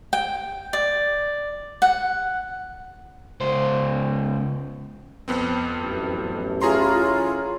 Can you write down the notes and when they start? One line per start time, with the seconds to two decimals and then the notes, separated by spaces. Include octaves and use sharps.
0.13 G5
0.73 D5
1.82 F#5
3.40 C#2 C5
5.28 F2 B3 C4
5.81 A1 F#2 A3
6.62 C#4 E4 F4 G#4 C#5 A#5 C6